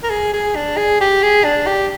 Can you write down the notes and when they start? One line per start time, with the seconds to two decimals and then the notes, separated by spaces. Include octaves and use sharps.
0.04 A#4
0.10 G#4
0.34 G#4
0.56 D4
0.77 G#4
1.01 G4
1.23 G#4
1.44 D4
1.67 G4